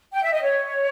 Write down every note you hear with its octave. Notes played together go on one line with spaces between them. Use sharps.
G5
E5
D#5
C#5